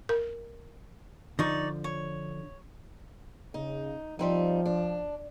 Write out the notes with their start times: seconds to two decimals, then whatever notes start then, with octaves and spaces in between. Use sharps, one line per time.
0.09 A#4
1.39 D3 F3 D#4 D5 C#6
1.84 C#5
3.54 C#3 D#4
4.19 F3 G3 C4 D#4
4.66 D4